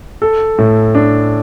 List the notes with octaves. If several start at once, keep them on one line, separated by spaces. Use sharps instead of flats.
A4
A2
D4